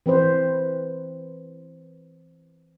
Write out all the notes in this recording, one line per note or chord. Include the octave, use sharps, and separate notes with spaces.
E3 C4 B4 C5